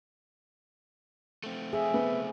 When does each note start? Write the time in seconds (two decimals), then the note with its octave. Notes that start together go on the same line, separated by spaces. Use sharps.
1.44 A3 C4
1.73 G#4 E5
1.94 B3